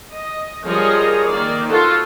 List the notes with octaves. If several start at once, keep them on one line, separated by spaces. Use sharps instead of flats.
D#5
F3 G3 G#4 A#4 C#5 D#5
D#3 A#3 D5
F4 F#4 A4 C5